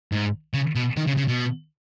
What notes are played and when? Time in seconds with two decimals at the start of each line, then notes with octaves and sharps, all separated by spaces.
0.12 G#2
0.54 C#3
0.76 B2
0.97 D#3
1.07 C#3
1.17 C#3
1.28 B2